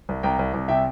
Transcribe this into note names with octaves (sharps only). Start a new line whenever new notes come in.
C2
C2 G5 A#5
C2
C2
C3 E5 G5